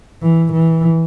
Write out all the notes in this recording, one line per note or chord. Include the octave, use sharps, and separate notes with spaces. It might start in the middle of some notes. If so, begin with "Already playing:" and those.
E3
E3